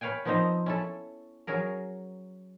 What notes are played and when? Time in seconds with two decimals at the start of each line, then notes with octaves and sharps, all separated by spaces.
0.01 B4 C#5 F5 G5 G#5
0.25 F3 B3 C4 D#4 C5 D#5
0.66 C#4 E4 A4
1.47 F#3 C#4 G#4 A#4